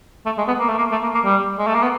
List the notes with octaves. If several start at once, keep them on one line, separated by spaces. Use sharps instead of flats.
A3
G#3
B3
A#3
A3
A#3
A3
A#3
A#3
G3
G#3
A3
A#3
B3